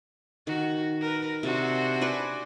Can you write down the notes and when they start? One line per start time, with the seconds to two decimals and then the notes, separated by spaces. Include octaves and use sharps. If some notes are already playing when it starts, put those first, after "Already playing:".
0.47 D#3 F#4
1.01 A#4 B4
1.43 C3 D4 F#4 C5
2.01 B4 D5 G#5